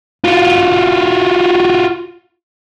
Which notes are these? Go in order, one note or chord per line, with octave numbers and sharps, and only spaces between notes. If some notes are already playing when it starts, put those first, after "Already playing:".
F4 F#4